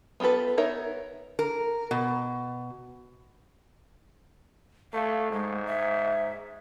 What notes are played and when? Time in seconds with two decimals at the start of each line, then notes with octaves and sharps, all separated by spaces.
0.20 B3 F4 G4 A4 B4
0.58 B3 D#4 A#4 C#5 E5
1.39 A#4
1.91 B2
4.93 A3 F5
5.32 G#2 G#3
5.66 E5